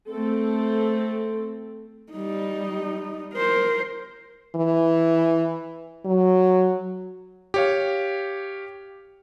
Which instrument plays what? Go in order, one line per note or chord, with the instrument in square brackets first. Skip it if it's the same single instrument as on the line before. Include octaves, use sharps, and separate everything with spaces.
[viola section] A3 C4 A4
[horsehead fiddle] G3 D#4
A#4 C5
[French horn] E3
F#3
[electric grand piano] G4 C#5 F5